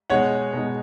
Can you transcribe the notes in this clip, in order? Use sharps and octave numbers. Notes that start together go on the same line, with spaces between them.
B2 G#3 D#4 C#5 F#5
B2 G#3 D#4